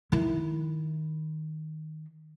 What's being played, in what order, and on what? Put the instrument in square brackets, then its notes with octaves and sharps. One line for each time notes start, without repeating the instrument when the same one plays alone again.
[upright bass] D#3 E4